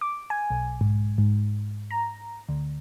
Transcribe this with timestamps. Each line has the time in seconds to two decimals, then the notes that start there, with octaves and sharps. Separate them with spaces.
0.01 D6
0.30 G#5
0.50 B1
0.81 G#2
1.18 G#2
1.91 A#5
2.49 D2